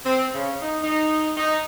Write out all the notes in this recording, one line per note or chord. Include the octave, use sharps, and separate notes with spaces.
C4
C#3
D#4
D#4
D#4